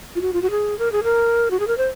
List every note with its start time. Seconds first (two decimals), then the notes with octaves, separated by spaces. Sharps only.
0.16 F4
0.21 F#4
0.33 F4
0.42 F#4
0.51 G#4
0.79 A#4
0.92 G#4
1.04 A#4
1.51 F#4
1.60 G#4
1.67 A#4
1.78 C5